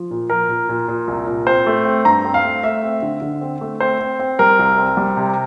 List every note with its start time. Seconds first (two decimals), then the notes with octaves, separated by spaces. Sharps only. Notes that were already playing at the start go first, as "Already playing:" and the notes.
Already playing: F3
0.11 A#2
0.30 F3 A#4
0.49 A#2
0.69 A#2
0.88 A#2
1.07 C2
1.27 A#2
1.47 C4 C5
1.66 A3
1.85 C4
2.05 G2 A#5
2.25 C4
2.34 F5
2.44 A3
2.63 A3 E5
2.83 C4
3.02 D3
3.22 D3
3.41 C4
3.61 A3
3.80 C4 C5
4.00 C4
4.19 C4
4.39 G3 A#4
4.59 C2
4.78 C4
4.97 G3
5.17 C3